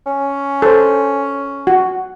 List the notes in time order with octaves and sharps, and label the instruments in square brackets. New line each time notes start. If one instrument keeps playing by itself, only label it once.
[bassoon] C#4
[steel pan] A4 C5
F#4